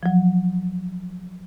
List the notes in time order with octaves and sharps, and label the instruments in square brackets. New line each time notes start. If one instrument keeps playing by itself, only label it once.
[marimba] F3 F#3